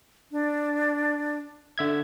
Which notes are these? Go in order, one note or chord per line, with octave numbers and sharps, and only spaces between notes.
D4
D3 E5 G#6